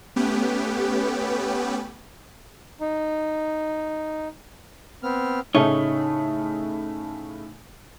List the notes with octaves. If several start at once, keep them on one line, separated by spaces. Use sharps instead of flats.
A3 B3 C#4 G4 B4
D#4
B3 C4 F6
A2 C#3 A3 D#4 C#5